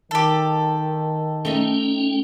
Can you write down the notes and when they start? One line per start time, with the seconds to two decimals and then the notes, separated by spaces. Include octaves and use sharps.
0.11 D#3 G4 A4
1.45 A3 C#4 D#4 G5